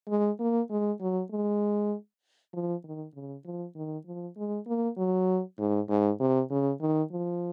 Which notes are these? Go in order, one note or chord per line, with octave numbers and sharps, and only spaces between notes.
G#3
A#3
G#3
F#3
G#3
F3
D#3
C#3
F3
D#3
F3
G#3
A#3
F#3
G#2
G#2
C3
C#3
D#3
F3